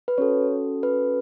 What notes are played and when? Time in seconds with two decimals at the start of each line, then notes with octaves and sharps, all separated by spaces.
0.08 B4
0.18 C#4 F#4 A4 C#5
0.83 B4